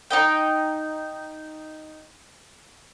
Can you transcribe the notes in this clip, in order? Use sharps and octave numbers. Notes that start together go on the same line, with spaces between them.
D#4 D#5 G5